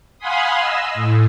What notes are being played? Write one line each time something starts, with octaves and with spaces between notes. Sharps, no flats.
F5 F#5 G#5 B5 C6 D#6
D#5 E6
A2